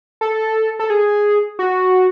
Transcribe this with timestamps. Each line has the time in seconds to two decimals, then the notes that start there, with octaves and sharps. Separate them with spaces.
0.21 A4
0.79 A4
0.90 G#4
1.59 F#4